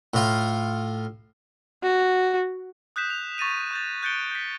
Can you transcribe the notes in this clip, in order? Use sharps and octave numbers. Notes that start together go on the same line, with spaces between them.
A2 F4
F#4
D#6 F#6 G6 B6 E7
F7
C#6 A6 A#6 D#7 E7
C#6 G6 A6
F#6 G6 A6 C#7 D7 G7
G6 B6